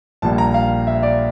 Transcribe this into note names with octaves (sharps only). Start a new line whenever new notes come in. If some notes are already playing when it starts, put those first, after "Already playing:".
A#1 A#2 G3 A5
A#5
F5
E5
D5